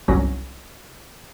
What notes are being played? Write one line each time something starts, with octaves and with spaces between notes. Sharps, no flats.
G1 C2 F#3 C#4 A#6